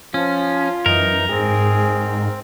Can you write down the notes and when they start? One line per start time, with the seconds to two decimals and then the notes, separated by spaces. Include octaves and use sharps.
0.14 F3 C#4 F4
0.86 F#2 E3 D#4 A#4
1.30 G#2 C4 G#4